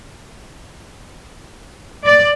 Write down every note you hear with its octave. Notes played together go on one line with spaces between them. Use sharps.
D5